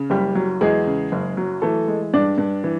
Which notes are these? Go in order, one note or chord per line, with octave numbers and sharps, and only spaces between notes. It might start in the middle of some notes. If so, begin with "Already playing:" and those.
Already playing: C#3
F#1 G3 G4
F#3
E2 G#3 G#4
C#3
F#1
F#3
E3 A3 A4
G#3
G2 D4 D5
G2
E3